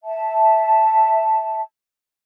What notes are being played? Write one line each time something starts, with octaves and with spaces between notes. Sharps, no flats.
E5 A5